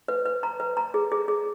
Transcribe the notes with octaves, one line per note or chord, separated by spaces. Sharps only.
B4
B4
A#5
B4
A#5
G#4
G#4
G#4